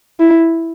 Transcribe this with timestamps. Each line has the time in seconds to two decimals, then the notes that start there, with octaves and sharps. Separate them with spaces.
0.20 E4